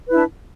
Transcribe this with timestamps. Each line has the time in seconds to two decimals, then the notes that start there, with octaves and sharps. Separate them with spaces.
0.07 B4
0.11 E4
0.14 D4